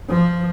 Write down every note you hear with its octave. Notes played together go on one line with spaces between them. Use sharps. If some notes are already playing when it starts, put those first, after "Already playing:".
F3